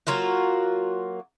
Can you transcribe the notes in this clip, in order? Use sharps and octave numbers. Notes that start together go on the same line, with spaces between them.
F#3 A#3 F4 F#4